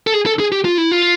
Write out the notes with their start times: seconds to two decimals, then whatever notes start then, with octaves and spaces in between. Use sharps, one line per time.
0.07 A4
0.14 G#4
0.26 A4
0.40 G#4
0.52 G4
0.65 F4
0.78 E4
0.91 F4